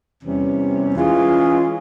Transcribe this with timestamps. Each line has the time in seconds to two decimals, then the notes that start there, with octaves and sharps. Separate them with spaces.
0.23 E2 C3 E3 G3 C#4
0.94 E3 G#3 C#4 F4 G#4